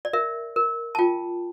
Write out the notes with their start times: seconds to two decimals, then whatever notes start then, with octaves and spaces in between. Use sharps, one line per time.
0.05 D5
0.13 A#4 E5
0.56 A#4
0.95 A5
0.99 F4 G5